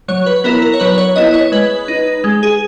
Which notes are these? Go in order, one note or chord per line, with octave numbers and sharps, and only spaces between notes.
F#3 C#5
B4
B3 E4 A#4
A#4
C#5
F#3 B4
C#5
B3 E4 D#5
C#5
G#3 B4
D#4
G#3
G#4